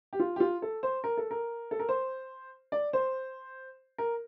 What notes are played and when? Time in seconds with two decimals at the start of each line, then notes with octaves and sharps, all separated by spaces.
0.13 G4
0.20 F4
0.36 G4
0.40 F4
0.62 A4
0.83 C5
1.04 A#4
1.17 A4
1.31 A#4
1.71 A4
1.79 A#4
1.89 C5
2.72 D5
2.93 C5
3.98 A#4